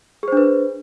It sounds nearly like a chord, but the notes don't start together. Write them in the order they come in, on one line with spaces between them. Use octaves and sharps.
G#4 C5 D4 B4